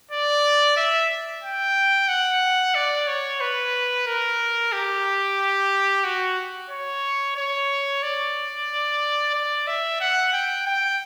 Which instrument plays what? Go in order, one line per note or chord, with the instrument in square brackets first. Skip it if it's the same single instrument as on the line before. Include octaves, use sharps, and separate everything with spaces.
[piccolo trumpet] D5
E5
G5
F#5
D5
C#5
B4
A#4
G4
F#4
C#5
C#5
D5
D5
E5
F#5
G5
G5